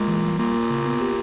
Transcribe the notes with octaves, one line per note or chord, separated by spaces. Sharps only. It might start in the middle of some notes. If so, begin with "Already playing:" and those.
Already playing: A#2 G#3
E3
G3
A#2 A#3
A#3
C#3
B3
G4